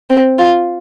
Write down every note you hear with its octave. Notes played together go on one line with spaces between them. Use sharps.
C4
F4